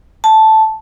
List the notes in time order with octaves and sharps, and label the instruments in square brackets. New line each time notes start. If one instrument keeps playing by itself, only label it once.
[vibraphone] A5